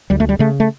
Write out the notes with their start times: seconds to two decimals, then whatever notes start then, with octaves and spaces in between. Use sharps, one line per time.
0.10 D2 G3
0.20 A3
0.29 G3
0.39 C#3 A3
0.60 A3